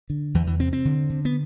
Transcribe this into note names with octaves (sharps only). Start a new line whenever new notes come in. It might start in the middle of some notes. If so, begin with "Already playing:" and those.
D3
E2 E3
E3
C3 C4
C4
D3
D3
B3